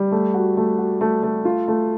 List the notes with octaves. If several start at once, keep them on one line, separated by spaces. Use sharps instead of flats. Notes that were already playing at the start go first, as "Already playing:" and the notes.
Already playing: G3
A3
F#4
A3
F#4
A3
A3
F4
A3